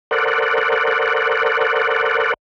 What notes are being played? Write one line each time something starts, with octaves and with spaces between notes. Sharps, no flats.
A4 A#4 C5 D5 F#5